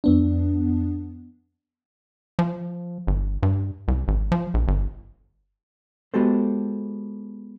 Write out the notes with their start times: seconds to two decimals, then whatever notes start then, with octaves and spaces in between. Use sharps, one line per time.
0.04 F2 B3 D4
2.39 F3
3.07 G1
3.43 G2
3.88 C2
4.08 G#1
4.32 F3
4.54 A#1
4.68 G1
6.14 G#3 B3 F#4 G4 A4 C5